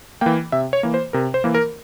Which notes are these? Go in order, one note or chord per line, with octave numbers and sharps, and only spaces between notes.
E3 A#3 G5
C3 E5
C#5
E3 A#3
C5
C3 A#4
C5
E3 A#3
A#4